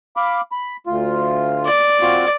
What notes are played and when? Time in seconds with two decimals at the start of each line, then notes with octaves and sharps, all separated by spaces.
0.17 F5 B5 D6
0.52 B5
0.87 D2 F4
1.67 D5
2.01 C4 F4 F#4